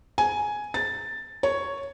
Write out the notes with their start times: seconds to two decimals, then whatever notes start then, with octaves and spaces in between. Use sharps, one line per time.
0.18 G#5
0.74 A6
1.43 C#5